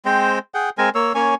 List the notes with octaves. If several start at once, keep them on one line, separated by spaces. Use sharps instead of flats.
G#3 C4 C5 G5
G#4 F#5 G5
G#3 C4 A#4 G#5
A#3 C#5 E6
A#3 C#4 C#5 G#5